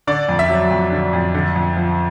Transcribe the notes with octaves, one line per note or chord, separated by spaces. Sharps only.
D3 D5
F2
E5
F#3
F2
D3
F2
D3
F2
F3